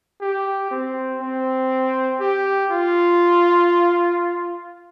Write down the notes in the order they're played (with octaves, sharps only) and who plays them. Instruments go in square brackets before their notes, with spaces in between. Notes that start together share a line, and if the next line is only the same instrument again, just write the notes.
[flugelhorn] G4
C4
C4
G4
F4